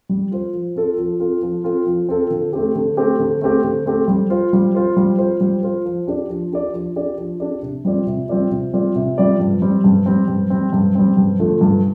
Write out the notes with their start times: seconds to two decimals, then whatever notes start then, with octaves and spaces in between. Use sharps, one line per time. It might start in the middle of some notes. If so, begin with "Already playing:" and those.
0.09 G3
0.31 F4 C5
0.53 F3
0.76 C4 F4 A4
0.98 F3
1.20 C4 F4 A4
1.43 F3
1.64 C4 F4 A4
1.87 F3
2.09 C4 F4 A4
2.30 D3
2.53 A3 C4 G4
2.75 D3
2.97 A3 C4 G4
3.19 D3
3.41 A3 C4 G4
3.64 D3
3.86 A3 C4 G4
4.08 G3
4.30 F4 C5
4.53 G3
4.75 F4 C5
4.97 G3
5.19 F4 C5
5.41 G3
5.63 F4 C5
5.85 F3
6.07 D4 G4 D5
6.30 F3
6.52 D4 G4 D5
6.74 F3
6.96 D4 G4 D5
7.19 F3
7.40 D4 G4 D5
7.63 C3
7.85 G3 C4 F4 D5
8.07 C3
8.29 G3 C4 F4 D5
8.51 C3
8.73 G3 C4 F4 D5
8.96 C3
9.18 G3 C4 F4 D5
9.40 G2
9.62 G3 C4
9.84 G2
10.06 G3 C4
10.28 G2
10.50 G3 C4
10.73 G2
10.95 G3 C4
11.17 G2
11.39 D3 F3 A3
11.61 G2